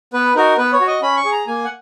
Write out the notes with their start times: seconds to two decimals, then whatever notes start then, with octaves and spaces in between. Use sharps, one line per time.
0.14 B3 B4
0.36 D#4 F#4 A#4
0.58 B3 B4
0.73 C#5
0.80 F#4
0.87 D#5
1.02 C#4 B5
1.17 C#6
1.25 G#4
1.32 A#5
1.47 A#3 G#5
1.65 F#5